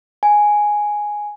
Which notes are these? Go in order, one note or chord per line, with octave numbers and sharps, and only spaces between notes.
G#5